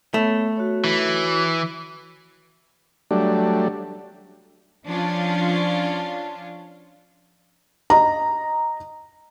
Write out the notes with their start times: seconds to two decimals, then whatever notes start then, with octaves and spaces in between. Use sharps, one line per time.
0.14 A3 B3 C#5 B5
0.57 F#4 C#5
0.84 E3
3.11 F#3 G3 A3 D4
4.87 F3 C#4 D4 F4
7.90 D#5 A#5